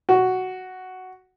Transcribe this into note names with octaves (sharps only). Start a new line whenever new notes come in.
F#4